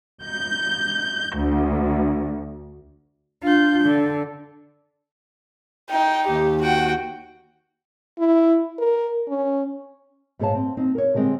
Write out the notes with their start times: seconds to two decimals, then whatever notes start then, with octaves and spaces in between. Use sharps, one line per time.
0.23 G6
1.36 D2
3.43 D4 F4 G6
3.85 D3
5.90 D#4 G5
6.28 D#2 G4
6.63 F#4 F#5 G5
8.18 E4
8.78 A#4
9.28 C#4
10.39 G#2 B3 G#4 C#5 F5 A5
10.55 C4
10.77 C4 D#4
10.95 A#4 C#5
11.14 D3 G3 G#3 C4 G#4